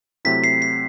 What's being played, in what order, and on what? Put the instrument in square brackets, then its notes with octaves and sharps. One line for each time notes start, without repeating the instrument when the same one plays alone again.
[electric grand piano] C3 F#3 A3 C4 E4 [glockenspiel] B6
[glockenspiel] C7
C7